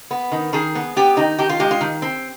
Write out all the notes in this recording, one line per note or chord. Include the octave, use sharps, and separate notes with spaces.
B3
D#3
D#3 G#4
B3
B3 G4
D#3 D#4
D#3 G4
F4
G#3 G4
F4
D#3
C4